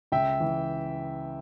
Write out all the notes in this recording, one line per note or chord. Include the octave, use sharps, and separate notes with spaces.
C#2 E5 G5
E3